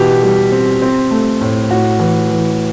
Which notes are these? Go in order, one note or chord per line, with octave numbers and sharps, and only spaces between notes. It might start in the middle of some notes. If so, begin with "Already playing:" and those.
Already playing: B2 E3 G4
G3
C4
C4
A3
A2
A2 F#4
E3
E3